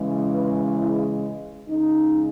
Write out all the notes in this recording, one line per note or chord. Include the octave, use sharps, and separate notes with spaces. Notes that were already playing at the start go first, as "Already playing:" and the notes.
Already playing: C#3 E3 G#3
B4
E4
C#3 G#3 D#4